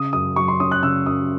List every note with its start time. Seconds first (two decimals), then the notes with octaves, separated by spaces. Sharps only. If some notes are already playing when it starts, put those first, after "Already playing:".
Already playing: C#3 D#6
0.13 F#2 D#6
0.36 F#3 C#6
0.48 C6
0.60 C#4 D#6
0.71 F#6
0.83 C#3 E6
1.06 F#2 D#6